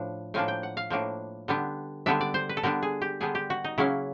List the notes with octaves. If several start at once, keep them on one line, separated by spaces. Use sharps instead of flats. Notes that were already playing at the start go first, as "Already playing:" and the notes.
Already playing: A2 F3 D4
A2 F3 A#3 D4 G#5
G5
F#5
F5
A2 F3 A#3 D4
D3 G3 B3 D4
D3 G3 B3 D4 E5
D5
C5
B4
A4
D3 G3 B3 D4 A#4
G#4
G4
D3 G3 B3 D4 G#4
G4
F#4
D#4
C#3 F#3 A#3 C#4 E4